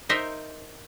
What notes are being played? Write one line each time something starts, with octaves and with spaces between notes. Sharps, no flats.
D#4 A#4 C5 D#5 E5